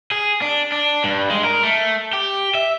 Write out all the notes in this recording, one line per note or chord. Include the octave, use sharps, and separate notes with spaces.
G#4
D4
D4
G2
G#3
A#4
A3
G4
E5